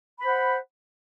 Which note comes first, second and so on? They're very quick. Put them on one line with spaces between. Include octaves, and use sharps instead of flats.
B5 C5 F#5